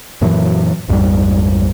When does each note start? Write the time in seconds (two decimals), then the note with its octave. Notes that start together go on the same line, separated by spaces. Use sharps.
0.21 F#2 A#2 E3 F#3
0.88 A#1 F2 G#2 G3